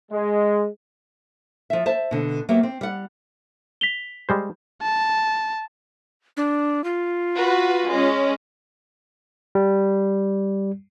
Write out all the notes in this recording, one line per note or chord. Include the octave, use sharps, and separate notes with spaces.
G#3
F3 E5
C5 E5 A5
B2 D3
F#3 A#3 B3 G4 E5
C4
G3 F#5
B6 F7 G7
G3 G#3 C5
A5
D4
F4
F#4 B4
G#3 C#4
G3